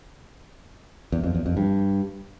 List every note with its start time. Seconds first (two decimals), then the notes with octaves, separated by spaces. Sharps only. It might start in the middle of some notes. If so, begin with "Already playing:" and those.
1.12 E2
1.24 F2
1.35 E2
1.46 F2
1.57 G2